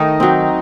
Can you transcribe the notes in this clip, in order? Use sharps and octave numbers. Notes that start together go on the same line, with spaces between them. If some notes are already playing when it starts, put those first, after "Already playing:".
Already playing: D#3 A3 D#4
F#3 C4